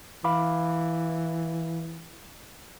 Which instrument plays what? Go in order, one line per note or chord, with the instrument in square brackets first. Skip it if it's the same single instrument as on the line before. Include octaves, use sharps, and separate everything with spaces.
[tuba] E3 [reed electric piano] F5 B5 D6